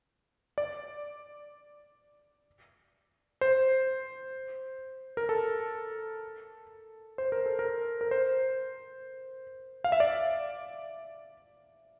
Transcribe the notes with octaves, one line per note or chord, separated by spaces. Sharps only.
D5
C5
A#4
A4
C5
A#4
A4
A#4
A#4
C5
F5
E5
D5